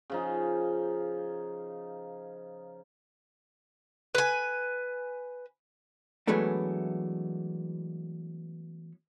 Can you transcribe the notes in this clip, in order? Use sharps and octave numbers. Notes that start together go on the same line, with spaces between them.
C#3 F3 D#4
B4 G#5
E3 F#3 G#3 A3 B3 D4